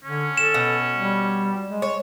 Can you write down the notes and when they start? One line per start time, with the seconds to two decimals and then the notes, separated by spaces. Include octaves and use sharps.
0.04 D3 C#4
0.38 A4 E7
0.54 B2
0.97 G3
1.67 G#3
1.82 C#5